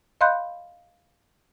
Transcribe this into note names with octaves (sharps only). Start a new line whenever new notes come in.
D#5 F5 B5 C6 F#6 G6